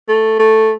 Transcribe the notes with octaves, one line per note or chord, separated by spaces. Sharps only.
A3
A3